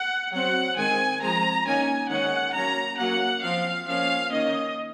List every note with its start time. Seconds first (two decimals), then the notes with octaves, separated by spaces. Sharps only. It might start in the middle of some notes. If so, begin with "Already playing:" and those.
Already playing: F#5
0.32 F#3 C4 F#5
0.77 D#3 G#3 C4 G#5
1.20 F3 G#3 C4 A#5
1.65 D#3 A#3 C#4 G#5
2.09 D#3 G#3 C#4 F#5
2.53 F#3 A#3 C#4 A#5
2.98 F#3 A#3 C#4 F#5
3.42 F3 C4 F5
3.87 F3 A#3 C#4 F5
4.31 D#3 A#3 C#4 D#5